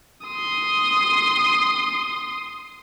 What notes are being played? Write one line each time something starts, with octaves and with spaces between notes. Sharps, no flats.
C6 D#6